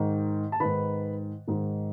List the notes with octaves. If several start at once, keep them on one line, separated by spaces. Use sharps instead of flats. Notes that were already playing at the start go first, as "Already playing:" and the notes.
Already playing: G#2 D#3
A5
G#2 D#3 B4 B5
G#2 D#3